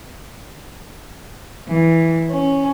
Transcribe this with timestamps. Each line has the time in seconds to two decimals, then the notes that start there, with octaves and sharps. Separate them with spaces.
1.67 E3
2.31 C#4